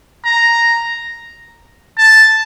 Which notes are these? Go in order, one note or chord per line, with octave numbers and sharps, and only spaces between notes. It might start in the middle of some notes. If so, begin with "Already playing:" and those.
A#5
A5